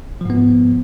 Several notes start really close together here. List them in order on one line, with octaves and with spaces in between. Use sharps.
F3 G#2 B3